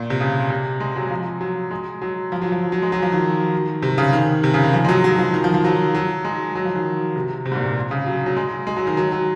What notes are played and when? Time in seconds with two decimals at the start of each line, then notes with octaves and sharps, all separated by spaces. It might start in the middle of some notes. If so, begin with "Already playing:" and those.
Already playing: A#2
0.10 C3
0.20 C#3
0.50 C3
0.80 G#3
0.96 F#3
1.10 F3
1.41 F#3
1.71 G#3
2.02 F#3
2.32 F3
2.42 F#3
2.52 F3
2.72 F#3
2.82 G#3
2.92 F#3
3.02 F3
3.12 D#3
3.83 C3
3.98 C#3
4.13 D#3
4.44 C3
4.54 C#3
4.63 D#3
4.74 F3
4.84 G#3
4.89 F#3
5.04 F#3
5.19 F3
5.34 D#3
5.44 F3
5.54 F3
5.64 F#3
5.95 F#3
6.24 G#3
6.55 F#3
6.65 F3
6.75 D#3
7.16 C3
7.46 C3
7.52 G#2
7.56 A#2
7.66 A#2
7.91 C#3
8.06 F#3
8.26 F#3
8.37 G#3
8.67 G#3
8.77 F#3
8.87 D#3
8.97 F#3
9.12 F#3